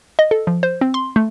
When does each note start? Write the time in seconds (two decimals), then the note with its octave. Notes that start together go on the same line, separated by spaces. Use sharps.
0.19 D#5
0.31 A4
0.47 F3
0.63 C5
0.81 C4
0.94 C6
1.16 A3